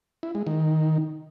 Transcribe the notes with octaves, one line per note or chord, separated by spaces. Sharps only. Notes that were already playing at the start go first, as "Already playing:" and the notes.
E4
G#3
D#3